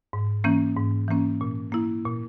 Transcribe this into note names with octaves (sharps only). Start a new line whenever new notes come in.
G#2
E3 A#3 C#4
G#2
E3 A#3 C#4
A#2
A#3 E4
A#2